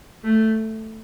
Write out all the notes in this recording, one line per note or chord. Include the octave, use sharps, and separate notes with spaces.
A3